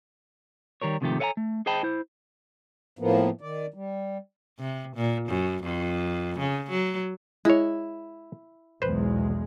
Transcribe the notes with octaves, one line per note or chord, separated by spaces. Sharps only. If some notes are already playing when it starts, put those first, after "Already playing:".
D#3 G3 A#4 C#5
G#2 C3 D#3 F3 A3 G4
A4 C#5 D#5 F5 G#5 A#5
A3
G#4 C5 D#5 G5 A5 B5
E4 C5
A2 F3 A#3 B3
D#3 D5
G3
C3
A#2
F#2
F2
C#3
F#3
G#3 E4 C#5
B1 E2 G#3 B4 C5